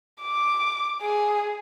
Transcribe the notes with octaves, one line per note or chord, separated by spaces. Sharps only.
D6
G#4